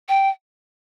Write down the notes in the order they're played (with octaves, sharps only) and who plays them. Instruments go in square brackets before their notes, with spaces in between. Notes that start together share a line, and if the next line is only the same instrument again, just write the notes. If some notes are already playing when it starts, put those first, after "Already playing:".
[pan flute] G5